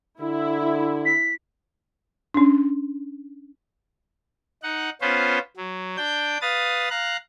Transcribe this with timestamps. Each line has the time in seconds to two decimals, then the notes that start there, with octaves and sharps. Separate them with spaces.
0.21 D3 E4
1.05 B6
2.34 C#4 D4
4.63 D#4 F#5
5.01 B3 C#4 F4 B4 C5
5.57 F#3
5.97 D4 G5 G6
6.41 B4 F5 D#6 A6
6.90 F5 A#5 F#6